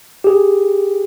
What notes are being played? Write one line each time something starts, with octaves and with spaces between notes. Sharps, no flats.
G4 G#4